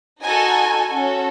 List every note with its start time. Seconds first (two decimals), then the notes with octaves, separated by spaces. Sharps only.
0.23 D#4 F#4 A4 G#5
0.89 C#4 F#4 A4